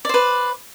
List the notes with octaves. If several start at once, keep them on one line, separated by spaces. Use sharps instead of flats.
B4 C5 D5